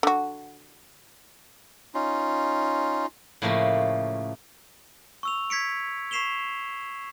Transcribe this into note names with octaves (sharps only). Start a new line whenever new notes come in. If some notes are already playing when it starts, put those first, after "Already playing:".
D3 F#4
C#4 D#4 F4
A2 C#3 F3 A3 A#3
C#6 E6 F7
G#6 B6 C#7 D7
C#6 B6 C7 E7 F7 G7